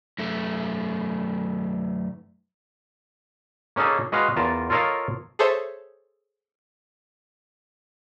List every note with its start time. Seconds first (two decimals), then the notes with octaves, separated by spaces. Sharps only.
0.18 F#2 A3
3.76 A#3 C#4 D#4 G#4 A4
4.12 G#3 F#4 B4 D#5 F5 G#5
4.36 E2 F4 A#4 A5
4.70 F4 A4 A#4 C#5 D#5 F5
5.39 G#4 A4 C5 C#5 E5